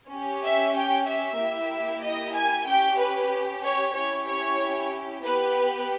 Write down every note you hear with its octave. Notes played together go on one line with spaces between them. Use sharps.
C#4 G4
E5
G5
E5
A#3 E4 G4
D#5
G#5
C#4 G4 G5
B4
C#5
C#4 E4 G4 C#5
C#5
B3 G4 B4